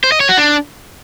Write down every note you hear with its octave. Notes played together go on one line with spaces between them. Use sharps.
C5
D#5
C#5
F#4
D4